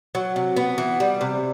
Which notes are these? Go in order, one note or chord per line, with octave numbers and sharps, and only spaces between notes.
F#3
C3
B3
E3
G3
C3